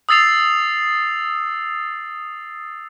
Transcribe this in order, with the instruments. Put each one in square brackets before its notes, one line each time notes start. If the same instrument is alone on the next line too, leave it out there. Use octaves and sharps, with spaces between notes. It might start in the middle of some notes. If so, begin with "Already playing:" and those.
[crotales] D#6 E6 A6 C7 F7